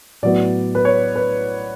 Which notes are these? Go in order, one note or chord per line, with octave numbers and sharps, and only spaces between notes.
A2 F#3 B3 D5
B4
C#5
B4